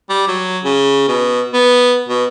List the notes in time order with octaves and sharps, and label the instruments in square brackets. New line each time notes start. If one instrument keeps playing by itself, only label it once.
[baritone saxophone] G3
F#3
C#3
B2
B3
B2